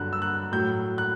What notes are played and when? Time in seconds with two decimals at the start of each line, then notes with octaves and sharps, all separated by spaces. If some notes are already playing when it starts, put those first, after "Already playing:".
Already playing: G2 D3 F#3 F#6
0.13 E6
0.22 F#6
0.52 A2 F#3 G6
0.98 F#6